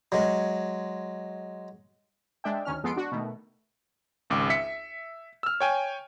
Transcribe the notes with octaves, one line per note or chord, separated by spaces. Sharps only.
F#3 G#3
G#3 D4 D5 E5 G5
D2 D#3 C#4 F6
F2 G#3 B3 A4 C6 D7
D4 F#4
B2 D#3 A3
G#1 C#2 D6
E5 B6 C#7
E6 F6
C#5 G5 G#5